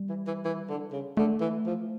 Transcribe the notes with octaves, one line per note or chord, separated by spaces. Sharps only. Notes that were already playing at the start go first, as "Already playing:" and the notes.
Already playing: G3
E3
E3
E3
D3
C#3
D3 A3
E3
F3